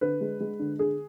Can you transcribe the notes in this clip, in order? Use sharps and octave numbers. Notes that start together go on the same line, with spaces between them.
D3 B4
G#3
G#3
D3
D3 G#4